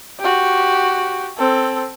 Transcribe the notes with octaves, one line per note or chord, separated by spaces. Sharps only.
F#4 G4
C4 A4